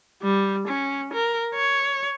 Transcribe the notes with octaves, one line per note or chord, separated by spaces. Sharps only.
G3
C#4
A#4
C#5